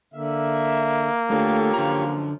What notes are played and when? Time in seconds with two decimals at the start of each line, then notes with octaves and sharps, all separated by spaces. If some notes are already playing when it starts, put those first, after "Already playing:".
0.14 D3 A#3 E5
1.30 A3 D4 F4 G4 A4 C#5
1.74 F#2 D3 F3 A#5